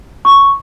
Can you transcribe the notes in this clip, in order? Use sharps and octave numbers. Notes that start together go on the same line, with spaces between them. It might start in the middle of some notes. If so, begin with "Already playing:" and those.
C#6